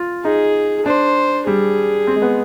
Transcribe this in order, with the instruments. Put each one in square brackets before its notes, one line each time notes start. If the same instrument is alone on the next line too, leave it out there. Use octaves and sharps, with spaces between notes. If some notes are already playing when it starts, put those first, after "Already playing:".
Already playing: [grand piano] F4
[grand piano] D#4 [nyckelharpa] G#4
[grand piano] D4 [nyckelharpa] C5
[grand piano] G3 [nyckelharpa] G#4
[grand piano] C4
G#3
B3